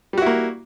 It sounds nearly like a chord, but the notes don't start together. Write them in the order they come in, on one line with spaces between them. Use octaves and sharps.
G3 F#4 E4 A#3